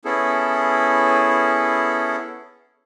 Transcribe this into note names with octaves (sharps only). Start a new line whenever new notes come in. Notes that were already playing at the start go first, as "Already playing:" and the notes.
B3 C#4 E4 G#4 A4